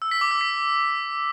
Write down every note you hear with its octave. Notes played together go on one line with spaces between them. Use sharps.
E6
B6
D6
E6
B6